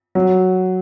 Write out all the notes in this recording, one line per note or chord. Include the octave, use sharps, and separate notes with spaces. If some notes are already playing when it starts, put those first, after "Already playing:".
F#3